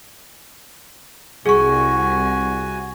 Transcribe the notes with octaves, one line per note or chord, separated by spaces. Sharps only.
C2 F#4 G#4 G#5 C#6